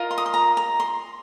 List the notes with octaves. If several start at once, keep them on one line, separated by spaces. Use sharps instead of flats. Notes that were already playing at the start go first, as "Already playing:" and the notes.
Already playing: F4 A#4 D#5
C6
D#6
C6
A#5
A#5
C6